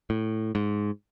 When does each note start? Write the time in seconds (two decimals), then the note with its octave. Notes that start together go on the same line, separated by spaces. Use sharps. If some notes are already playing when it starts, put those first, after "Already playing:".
0.10 A2
0.55 G#2